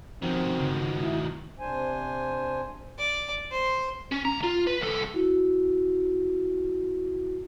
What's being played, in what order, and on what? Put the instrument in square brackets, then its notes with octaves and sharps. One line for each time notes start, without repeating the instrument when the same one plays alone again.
[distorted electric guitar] D#3 F#3 [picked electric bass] F3 C#4 [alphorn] C4
[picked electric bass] C#3
[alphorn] E4
[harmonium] C3 D4 C5 G#5
[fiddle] D5
C5
[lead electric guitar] C#4
C#2 A#5
F4
B4
C2 A4
[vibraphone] E4 F#4